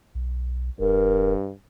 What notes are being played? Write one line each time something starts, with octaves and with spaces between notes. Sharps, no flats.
B1
E1 G2 A#4